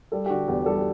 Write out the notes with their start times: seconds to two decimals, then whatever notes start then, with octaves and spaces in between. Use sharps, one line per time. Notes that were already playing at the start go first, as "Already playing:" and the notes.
0.12 G3 A4
0.26 G4
0.30 D3 F#4
0.48 E2 G4
0.66 G3 A4
0.78 G4